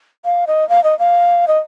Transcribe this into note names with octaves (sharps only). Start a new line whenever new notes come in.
F5
D#5
F5
D#5
F5
D#5